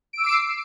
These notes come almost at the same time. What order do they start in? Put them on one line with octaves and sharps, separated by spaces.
D7 E6 D6 C7